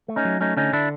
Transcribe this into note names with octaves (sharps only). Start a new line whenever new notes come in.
A3
C#4 D#4
F#3
A3 C#4 D#4
D3 C#4 D#4
D3 D4 E4